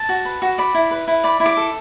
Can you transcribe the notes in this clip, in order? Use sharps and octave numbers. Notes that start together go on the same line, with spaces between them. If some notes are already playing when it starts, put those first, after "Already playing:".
Already playing: A5
F#4
B4
F#4
D5 B5
E4
B4
E4
D5 B5
E4
D6
A4